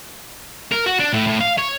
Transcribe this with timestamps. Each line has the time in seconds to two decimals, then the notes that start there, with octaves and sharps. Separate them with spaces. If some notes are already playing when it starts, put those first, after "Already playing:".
0.72 A#4
0.86 F#4
0.99 D4
1.13 A2
1.27 A2
1.40 F5
1.58 C#5